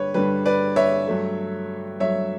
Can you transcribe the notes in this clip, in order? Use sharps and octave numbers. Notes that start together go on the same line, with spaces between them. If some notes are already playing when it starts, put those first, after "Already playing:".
Already playing: G2 D3 G3 B4 C#5
G2 D3 G3 B4
B4 D5
C#5 E5
G2 F#3 A3
G2 F#3 A3 C#5 E5